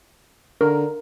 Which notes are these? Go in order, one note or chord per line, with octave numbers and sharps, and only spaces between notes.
D3 A#4